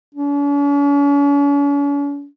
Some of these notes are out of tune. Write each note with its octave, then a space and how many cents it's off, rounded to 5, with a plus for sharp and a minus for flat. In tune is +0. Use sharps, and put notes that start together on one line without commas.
C#4 +45